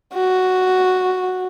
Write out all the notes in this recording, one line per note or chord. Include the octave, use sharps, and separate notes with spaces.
F#4